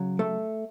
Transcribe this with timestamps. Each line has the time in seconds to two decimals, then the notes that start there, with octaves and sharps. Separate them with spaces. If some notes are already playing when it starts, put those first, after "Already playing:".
Already playing: C#3 F#3
0.19 A3